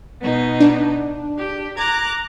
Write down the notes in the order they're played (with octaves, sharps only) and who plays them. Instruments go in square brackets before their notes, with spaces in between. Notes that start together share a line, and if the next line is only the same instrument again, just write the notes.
[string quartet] B2 B3 D#4
[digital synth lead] D4
[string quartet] G4
[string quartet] A#5 D6 F#6 [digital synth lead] G#6